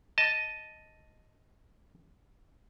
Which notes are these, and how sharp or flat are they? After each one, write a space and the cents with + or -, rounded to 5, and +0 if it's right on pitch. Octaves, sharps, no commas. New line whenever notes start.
D#5 +5 A5 +0